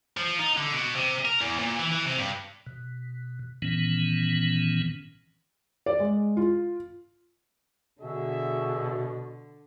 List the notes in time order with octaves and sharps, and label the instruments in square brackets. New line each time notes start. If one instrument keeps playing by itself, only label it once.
[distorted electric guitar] F3
D#4
D3
B2
C3
A#4
E2
A#2
E3
E3
C3
G2
[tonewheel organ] B2
A#2 D#3 E3 B3 C#4
[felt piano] D5
G#3
F4
[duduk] B2 [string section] D3 [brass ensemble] F#4 G#4 E5